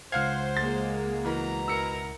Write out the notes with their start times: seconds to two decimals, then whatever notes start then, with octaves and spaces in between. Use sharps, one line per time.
0.12 C#2 C5 F5 F#5 F6 G#6
0.57 G#3 A#3 A6
1.24 B2 E3 A#4 A#5
1.68 E4 A#4 E6 C#7